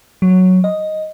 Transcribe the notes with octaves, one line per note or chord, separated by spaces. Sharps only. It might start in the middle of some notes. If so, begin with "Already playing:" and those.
F#3
D#5